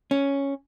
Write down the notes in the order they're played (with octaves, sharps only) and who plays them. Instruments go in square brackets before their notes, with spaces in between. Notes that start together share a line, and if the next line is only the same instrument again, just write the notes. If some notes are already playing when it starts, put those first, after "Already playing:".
[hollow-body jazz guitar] C#4